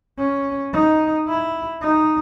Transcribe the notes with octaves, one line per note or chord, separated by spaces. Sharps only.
C#4
D#4
E4
D#4